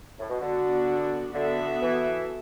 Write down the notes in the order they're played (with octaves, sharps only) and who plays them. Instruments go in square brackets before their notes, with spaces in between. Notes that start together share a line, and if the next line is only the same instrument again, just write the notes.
[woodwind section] A2
B2
[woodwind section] D3 [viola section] B3 D4 F#4
[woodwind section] D3 [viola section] B3 F#4 A4 E5
[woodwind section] E3